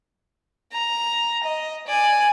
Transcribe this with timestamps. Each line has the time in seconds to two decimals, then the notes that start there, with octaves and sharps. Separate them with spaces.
0.73 A#5
1.44 D#5
1.87 D5 G#5